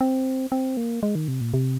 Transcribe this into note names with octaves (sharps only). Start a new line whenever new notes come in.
C4
C4
A#3
G#3
D#3
C3
A#2
C3